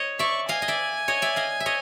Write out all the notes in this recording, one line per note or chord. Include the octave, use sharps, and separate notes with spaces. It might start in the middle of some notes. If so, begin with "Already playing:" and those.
Already playing: C#5 D#5
D5 E5 C#6
D#5 F5 G#5
D#5
D5 E5
C#5 D#5
D5 E5
D#5 F5
E5
C#5 D#5